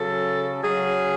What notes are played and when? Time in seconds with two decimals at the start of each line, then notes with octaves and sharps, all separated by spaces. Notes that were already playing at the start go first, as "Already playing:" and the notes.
Already playing: C#3 F#3 A4
0.63 C#3 F#3 G#4